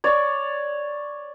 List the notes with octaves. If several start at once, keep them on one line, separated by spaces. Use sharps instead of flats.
C#5 D5